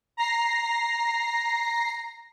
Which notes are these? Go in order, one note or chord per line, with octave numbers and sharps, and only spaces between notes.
A#5 A#6 C7